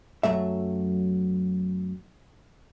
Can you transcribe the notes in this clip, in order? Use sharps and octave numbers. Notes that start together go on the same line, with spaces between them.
F#2 F#3 A3 E5